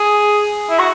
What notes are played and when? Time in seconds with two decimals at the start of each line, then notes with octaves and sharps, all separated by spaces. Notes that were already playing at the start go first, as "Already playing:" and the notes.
Already playing: G#4
0.70 E4
0.79 F#4